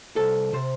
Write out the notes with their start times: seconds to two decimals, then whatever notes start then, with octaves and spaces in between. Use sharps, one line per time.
0.16 C2 A4
0.53 C3 C5